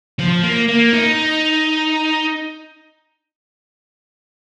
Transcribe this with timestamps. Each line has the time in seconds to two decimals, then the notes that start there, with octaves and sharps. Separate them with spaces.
0.19 F3
0.43 A#3
0.68 A#3
0.93 D#4